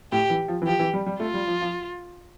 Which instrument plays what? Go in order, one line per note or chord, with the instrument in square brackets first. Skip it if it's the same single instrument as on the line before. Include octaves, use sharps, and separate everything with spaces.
[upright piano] A2 [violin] G4
[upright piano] E3
F3
E3
[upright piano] F3 [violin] G4
[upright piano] E3
G3
G3
[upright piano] A3 [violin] F4
[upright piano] G3
F3
F3